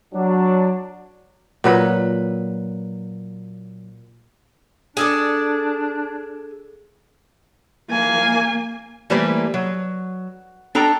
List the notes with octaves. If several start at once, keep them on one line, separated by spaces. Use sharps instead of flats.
F#3 D4
A#2 F#3 B4
D4 G#4 A4 D5
A#3 G#5
E3 G3 A3 A#3 B4 C5
F#3
D4 A4 G5 A#5